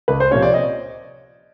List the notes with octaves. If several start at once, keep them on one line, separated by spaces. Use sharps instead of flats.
C#2 B4
C5
C3 F3 A#3 C#4 C#5
D5
D#5